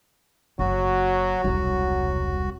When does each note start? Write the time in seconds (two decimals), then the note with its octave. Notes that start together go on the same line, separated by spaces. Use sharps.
0.59 F#1 F#3 F#4
1.44 E1 C2 F#3